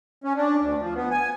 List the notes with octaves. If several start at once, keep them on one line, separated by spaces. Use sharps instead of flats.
C#4
D4
D2
F3
B3
G#5